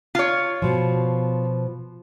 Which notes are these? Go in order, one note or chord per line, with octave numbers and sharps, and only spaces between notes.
F4 C#5
B2 F3